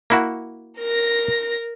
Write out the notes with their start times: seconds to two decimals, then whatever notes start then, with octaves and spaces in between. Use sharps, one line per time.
0.10 A#3 E4 F#4
0.78 A#4 A#6